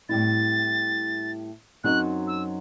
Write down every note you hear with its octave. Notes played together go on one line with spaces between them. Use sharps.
A2 G3 C4 E4 A6
F#2 F#3 C4 D#4 F#4 F#6
E6